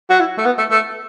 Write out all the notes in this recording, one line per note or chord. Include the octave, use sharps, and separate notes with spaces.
F#4
E4
A3
B3
A3
A3